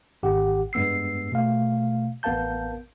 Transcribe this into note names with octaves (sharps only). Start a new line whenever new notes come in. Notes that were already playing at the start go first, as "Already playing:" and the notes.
G#1 G4 F#5
G2 G#3 B3 E6 C7
B2 A3 F5
A1 B3 A#4 F5 A5 G6